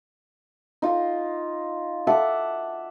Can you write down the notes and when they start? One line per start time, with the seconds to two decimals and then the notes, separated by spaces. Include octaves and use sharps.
0.82 D#4 F4
2.07 E5 F#5 A5 D6